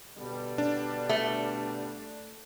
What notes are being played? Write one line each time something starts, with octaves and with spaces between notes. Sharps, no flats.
B2 D3 G3
D4
A3